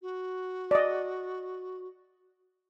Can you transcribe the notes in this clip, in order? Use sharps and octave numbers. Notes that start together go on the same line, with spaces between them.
F#4
D5 D#5